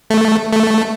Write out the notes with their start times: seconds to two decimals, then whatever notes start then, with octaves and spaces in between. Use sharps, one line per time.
0.10 A3
0.53 A3